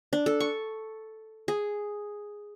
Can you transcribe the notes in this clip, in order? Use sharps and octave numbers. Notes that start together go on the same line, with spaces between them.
D4
A4
C#6
G#4